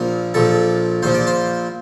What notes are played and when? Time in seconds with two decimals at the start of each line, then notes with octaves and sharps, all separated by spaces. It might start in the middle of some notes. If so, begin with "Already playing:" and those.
Already playing: A#1 A#2 F3 A#4
0.34 A#1 A#2 F3 A4
1.03 A#1 A#2 F3 C5
1.14 D5
1.27 C5